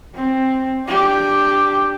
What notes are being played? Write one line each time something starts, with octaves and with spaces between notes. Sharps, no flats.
C4
D4 G4